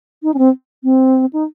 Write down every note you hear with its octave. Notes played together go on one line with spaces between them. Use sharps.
D#4
C#4
C4
C4
D#4